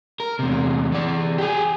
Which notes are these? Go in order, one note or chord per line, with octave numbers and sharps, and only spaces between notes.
A#4
E2 C3
E3 D5
G4 G#4